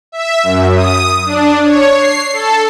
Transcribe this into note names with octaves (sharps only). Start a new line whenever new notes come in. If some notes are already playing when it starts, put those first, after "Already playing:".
E5
F#2
D#6
D4
C#5
C7
A4